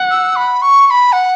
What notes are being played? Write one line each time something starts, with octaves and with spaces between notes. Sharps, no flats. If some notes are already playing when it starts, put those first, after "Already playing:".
Already playing: F#5
E6
B5
C#6
C#6
B5
F#5